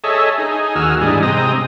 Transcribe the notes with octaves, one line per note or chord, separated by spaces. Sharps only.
G#4 A4 C#5 D#5 E5
D#4 G#4
D#2 F#4 G#4 E6 F6
G#2 E3 G3 D4 D#4 G#4
C3 G#3 C4 D#5 A#5 D#6